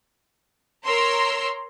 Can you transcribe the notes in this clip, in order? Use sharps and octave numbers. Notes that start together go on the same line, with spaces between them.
A#4 C#5 A#5 C6 E6